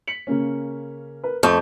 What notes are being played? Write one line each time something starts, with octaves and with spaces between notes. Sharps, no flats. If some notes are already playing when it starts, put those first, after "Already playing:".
B6 C#7 F#7
C#3 A#3 C#4
A#4 B4
F2 A3 G6